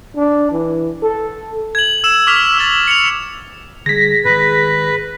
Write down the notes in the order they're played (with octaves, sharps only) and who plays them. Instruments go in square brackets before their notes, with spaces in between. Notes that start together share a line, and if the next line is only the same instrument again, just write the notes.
[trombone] D4
E3
A4
[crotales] G#6 F#7
E6 E7
C#6 D6 F6 B6 F7
E6 A6
C#7 F7
[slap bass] D3 G3 [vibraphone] G#4 [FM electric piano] A#6 B6
[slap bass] G#2 D#3 [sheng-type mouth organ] B4